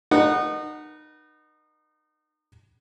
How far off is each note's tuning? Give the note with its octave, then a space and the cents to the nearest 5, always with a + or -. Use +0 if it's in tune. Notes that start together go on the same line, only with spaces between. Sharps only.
D#4 -30 B4 -45 F#5 +0